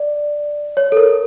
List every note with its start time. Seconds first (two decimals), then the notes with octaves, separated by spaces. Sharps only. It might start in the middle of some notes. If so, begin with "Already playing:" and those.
Already playing: D5
0.77 C#5
0.92 A4
0.97 A#4